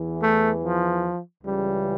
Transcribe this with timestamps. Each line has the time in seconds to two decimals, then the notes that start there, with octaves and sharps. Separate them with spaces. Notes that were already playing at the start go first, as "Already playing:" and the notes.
Already playing: E2 E3
0.20 A3
0.62 F3
1.43 C#2 C#3 E3 G3